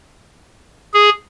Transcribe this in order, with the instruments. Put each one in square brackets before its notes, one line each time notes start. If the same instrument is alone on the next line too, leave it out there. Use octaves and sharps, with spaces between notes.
[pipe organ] G#4